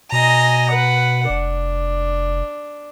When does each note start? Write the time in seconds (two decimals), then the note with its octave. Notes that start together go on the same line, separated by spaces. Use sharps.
0.12 B2 D#5 G#5 A#5
0.69 B4 F#5
1.29 F1 D4